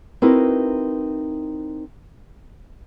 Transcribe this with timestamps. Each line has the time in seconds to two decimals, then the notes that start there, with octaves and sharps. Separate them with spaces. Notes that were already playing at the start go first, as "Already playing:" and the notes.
0.22 C4 D#4 E4 F#4 A#4 B4